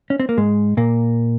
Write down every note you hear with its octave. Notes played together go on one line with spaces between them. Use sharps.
C#4
C4
A#3
G#2 G#3
A#2 A#3